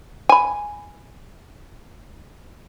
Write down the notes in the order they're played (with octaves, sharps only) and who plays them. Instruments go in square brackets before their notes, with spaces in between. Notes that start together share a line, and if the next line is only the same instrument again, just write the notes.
[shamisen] G#5 B5